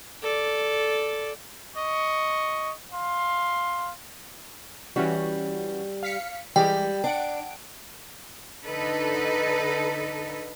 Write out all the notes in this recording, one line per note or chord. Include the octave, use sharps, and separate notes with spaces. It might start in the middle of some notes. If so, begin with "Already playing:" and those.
A4 D5
D#5 C#6
F5 C6
E3 G3 C#4 F#4
F5 B6 C#7
E3 G3 G#3 G4 G5
D4 F#5 D7
D3 D#4 A4 B4